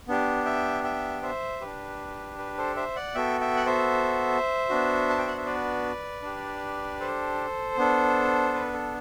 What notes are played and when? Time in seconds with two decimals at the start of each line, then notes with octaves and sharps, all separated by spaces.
0.08 B3 D4 G4
0.45 E5 G5
0.84 E5 G5
1.23 C5 E5
1.61 D4 G4 B4
2.38 B4
2.58 A4 C5
2.76 C5 E5
2.96 D5 F#5
3.15 B3 F#4 A4 E5 G5
3.41 E5 G5
3.56 F#5
3.66 C5 E5
4.69 B3 D4 F#4
5.10 A5
5.18 G5
5.28 F#5
5.37 E5
5.46 B4 D5
6.23 D4 G4
7.00 A4 C5
7.77 B3 D4 A4
8.54 B4
8.73 A4